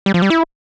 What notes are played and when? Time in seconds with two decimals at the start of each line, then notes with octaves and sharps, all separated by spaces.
0.06 G3
0.14 F3
0.22 G3
0.30 E4